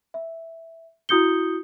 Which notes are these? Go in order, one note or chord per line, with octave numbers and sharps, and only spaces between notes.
E5
E4 F#4 D#6 G6 C#7 G7